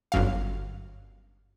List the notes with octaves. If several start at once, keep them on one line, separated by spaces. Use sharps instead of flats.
G1 F#2 F5